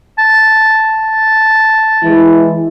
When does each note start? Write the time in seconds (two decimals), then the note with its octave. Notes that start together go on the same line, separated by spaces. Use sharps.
0.18 A5
2.02 E3 G#3 E4